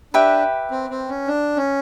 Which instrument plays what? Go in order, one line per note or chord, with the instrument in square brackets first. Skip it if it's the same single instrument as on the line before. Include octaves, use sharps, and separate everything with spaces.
[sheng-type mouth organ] D4 [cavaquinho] G4 B4 E5 G5
[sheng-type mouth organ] C4
C4
C#4
D4
C#4